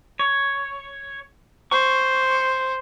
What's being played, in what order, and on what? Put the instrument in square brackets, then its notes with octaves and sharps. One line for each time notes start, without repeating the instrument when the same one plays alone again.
[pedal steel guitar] C#5
[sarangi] C5 [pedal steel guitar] C#6